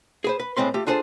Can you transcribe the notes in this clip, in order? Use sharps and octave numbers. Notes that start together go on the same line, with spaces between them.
G#4 B4 C5
B4
A2 G#3 C4 B4 C6
A3 F4 G4
D4 F4 G#4 A4 C5